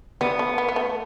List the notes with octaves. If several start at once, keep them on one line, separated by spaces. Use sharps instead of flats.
G3 B3
A3
B3
B3
A3